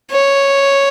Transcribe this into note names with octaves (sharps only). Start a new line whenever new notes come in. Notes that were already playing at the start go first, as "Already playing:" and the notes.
C#5